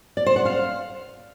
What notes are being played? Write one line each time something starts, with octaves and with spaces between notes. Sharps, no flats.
D5
C5
F#5
F5